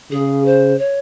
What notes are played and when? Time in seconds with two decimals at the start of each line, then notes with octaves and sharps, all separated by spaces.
0.12 C#3 G#4
0.46 C5
0.79 C#5